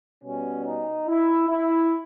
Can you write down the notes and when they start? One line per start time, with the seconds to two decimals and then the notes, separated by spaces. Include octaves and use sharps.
0.24 B2 G3 C#4
0.65 D#4
1.07 E4
1.49 E4